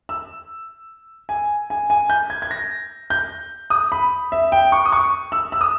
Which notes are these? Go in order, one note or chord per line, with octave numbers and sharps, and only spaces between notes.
E6
G#5
G#5
G#5
G6
G#6
G#6
A#6
G6
D#6
B5
E5
G5
C#6
D#6
C#6
E6
E6
D#6